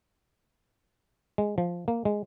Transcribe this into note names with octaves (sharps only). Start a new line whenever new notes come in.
G#3
F3
A#3
G#3